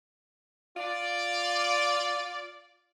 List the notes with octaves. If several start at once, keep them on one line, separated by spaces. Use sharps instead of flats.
F4 D5